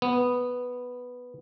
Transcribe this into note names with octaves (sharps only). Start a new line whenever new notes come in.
B3